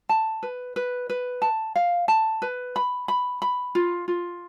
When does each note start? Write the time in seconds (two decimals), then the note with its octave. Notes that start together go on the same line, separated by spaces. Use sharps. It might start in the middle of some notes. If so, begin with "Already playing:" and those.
0.09 A5
0.43 B4
0.76 B4
1.10 B4
1.42 A5
1.76 F5
2.08 A5
2.42 B4
2.76 B5
3.08 B5
3.42 B5
3.75 F4
4.08 F4